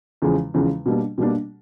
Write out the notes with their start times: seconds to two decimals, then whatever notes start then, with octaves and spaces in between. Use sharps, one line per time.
0.22 E2 C#3 F3 G#3
0.54 E2 C#3 F3 G#3
0.86 B2 G3 A#3 D4
1.18 B2 G3 A#3 D4